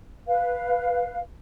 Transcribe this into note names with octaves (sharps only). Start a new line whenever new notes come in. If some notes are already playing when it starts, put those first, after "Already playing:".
B4 F5